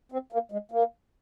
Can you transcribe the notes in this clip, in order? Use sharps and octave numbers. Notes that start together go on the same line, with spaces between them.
C4
A#3
G#3
A#3